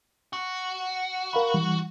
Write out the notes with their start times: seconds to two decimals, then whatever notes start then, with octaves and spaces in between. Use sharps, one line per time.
0.33 F#4
1.33 A#4 F5 B5
1.54 E3 G3